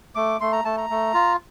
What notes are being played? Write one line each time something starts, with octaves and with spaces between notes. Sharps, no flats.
A3 D6
A3 C6
A#5
A3 A5
A#5
A3
F4